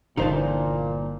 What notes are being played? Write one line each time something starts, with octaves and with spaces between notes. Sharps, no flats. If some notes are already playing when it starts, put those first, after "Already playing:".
G1 A#2 D3 E3 D#4 C5 A5